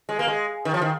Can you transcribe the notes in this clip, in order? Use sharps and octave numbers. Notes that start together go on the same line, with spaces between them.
G#3
A#3
G#3
D#3
F3
D#3